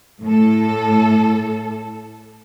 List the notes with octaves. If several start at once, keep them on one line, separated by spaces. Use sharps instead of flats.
A2 A4